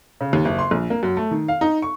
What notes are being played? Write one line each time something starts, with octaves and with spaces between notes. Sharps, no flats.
C#3
D#2
F#1
C6
A#1
A#3
F#2
A3
D#3
F5
D#4
C#6